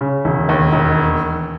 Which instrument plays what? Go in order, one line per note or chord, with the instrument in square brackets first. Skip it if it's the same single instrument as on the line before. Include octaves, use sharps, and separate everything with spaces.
[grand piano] C#3
E1
D#2
E1